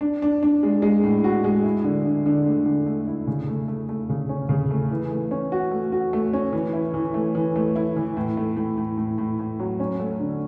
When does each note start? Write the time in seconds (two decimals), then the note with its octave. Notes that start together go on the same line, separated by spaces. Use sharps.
0.01 D4
0.22 D4
0.43 D4
0.63 G#3
0.82 G#3
1.04 A2
1.24 F#4
1.44 G#3
1.64 E4
1.84 D3
2.06 D3
2.26 D3
2.46 A3
2.66 D3
2.86 A3
3.07 E4
3.27 C#3
3.48 A3
3.68 A3
3.89 A3
4.09 C#3
4.29 C#4
4.49 C#3
4.71 A3
4.91 E3
5.11 A3
5.31 C#4
5.52 F#4
5.71 A3
5.92 F#4
6.13 A3
6.33 C#4
6.53 E3
6.73 E4
6.94 E3
7.14 A3
7.35 E3
7.56 A3
7.76 E4
7.96 E3
8.17 A2
8.37 A3
8.57 A2
8.78 A2
8.98 A2
9.18 A2
9.39 A2
9.59 F#3
9.80 C#4
10.00 A3
10.20 D3